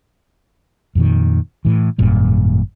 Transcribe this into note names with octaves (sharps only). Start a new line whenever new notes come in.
F2 A#2 D#3
A2 E3
G#1 F#2 A#2 G3